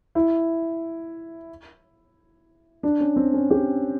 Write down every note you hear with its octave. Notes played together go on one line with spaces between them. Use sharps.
E4
D4
C#4
C4
C#4
G4